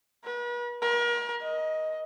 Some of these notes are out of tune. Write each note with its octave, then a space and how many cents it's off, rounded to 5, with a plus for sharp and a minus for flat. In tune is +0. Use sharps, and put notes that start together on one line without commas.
B4 -40
A#4 +35
D#5 +10